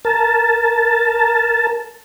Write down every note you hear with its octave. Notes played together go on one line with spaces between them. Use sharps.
A#4 A5